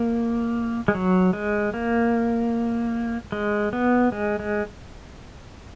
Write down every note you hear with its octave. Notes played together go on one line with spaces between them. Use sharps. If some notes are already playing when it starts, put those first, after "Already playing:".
Already playing: A#3
G#3
F#3
G#3
A#3
G#3
B3
G#3
G#3